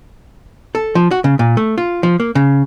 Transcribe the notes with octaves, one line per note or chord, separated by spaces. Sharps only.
A4
F3
F#4
C#3
A#2
A3
F4
F3
A#3
C#3